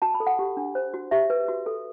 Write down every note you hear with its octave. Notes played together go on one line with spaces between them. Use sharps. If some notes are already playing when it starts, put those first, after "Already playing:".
F#4 A5
B5
A4
F#5
G4
D4
C5
F#4
G4 E5
B4
F#4
A4